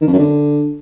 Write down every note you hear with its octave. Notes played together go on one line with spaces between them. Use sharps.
D#3
F2
F#2
D3